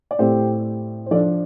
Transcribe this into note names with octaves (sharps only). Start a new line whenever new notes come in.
D5
A2 A3 C4 G4 C5
C5
F3 D4 A4 D5